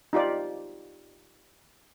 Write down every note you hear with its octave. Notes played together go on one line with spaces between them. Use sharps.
D#4 F4 G4 D5